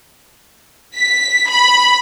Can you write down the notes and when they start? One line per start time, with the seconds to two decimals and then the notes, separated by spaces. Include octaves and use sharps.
0.96 B6
1.50 B5